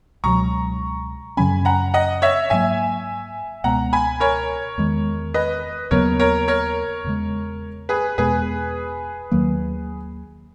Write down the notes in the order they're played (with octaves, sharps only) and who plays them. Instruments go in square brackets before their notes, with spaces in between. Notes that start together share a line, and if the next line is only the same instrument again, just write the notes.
[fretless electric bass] C#2 B2 F#3 [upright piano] A#5 C#6
[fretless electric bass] F#2 C#3 F#3 C#4 [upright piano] G#5 B5
[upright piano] F#5 A#5
D#5 F#5
C#5 E5
[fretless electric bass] G#2 F#3 A#3 [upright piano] E5 G#5
[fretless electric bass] C#2 B2 G#3 B3 [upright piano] F#5 A#5
[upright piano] G#5 B5
A#4 C#5
[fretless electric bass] E2 D#3 G#3
[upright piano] B4 D#5
[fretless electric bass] D#2 C#3 F#3 B3 [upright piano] A#4 C#5
[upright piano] A#4 C#5
A#4 C#5
[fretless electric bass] E2 C#3 G#3
[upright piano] G#4 B4
[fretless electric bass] E2 B2 G#3 B3 [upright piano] G#4 B4
[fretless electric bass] D#2 D#3 F#3 A#3